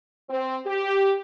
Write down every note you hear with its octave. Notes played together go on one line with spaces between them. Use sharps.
C4
G4